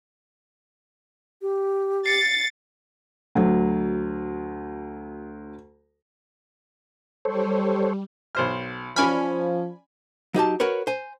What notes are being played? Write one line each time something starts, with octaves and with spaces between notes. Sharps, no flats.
G4
A6 C7 C#7
D2 F#3
G3 A4 C5 C#5
B1 C5 F6
F3 C#4 D5 G#5 B5 F6
F#3 D#4 G4 A5
F#4 A#4 B4 C#5
C5 G#5